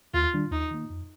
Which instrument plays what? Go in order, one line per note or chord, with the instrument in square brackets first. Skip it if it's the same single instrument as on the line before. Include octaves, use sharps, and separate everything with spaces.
[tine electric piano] D#2 [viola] F4
[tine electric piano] D#3 G3 D4
[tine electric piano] D#2 [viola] D#4
[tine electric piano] D#3 A#3
F2